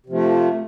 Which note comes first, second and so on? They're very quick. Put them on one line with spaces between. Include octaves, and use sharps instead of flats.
C3 F3 A3